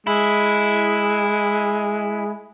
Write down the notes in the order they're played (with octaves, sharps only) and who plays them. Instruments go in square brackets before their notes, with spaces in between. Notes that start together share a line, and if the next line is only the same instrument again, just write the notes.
[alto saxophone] G#3 [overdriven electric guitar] E4